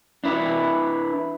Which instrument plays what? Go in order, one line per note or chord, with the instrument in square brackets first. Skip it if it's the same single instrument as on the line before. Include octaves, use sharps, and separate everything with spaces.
[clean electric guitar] D4 E4 B4